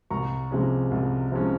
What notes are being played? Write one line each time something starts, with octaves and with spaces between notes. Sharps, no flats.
C2 A#5 C#6
C3 F3 G#3 C#4
C2
C3 F3 G#3 C#4